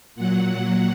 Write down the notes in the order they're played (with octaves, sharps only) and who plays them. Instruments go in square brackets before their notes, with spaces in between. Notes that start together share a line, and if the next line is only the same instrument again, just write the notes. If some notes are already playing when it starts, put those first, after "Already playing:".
[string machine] A#2 F#3 F#5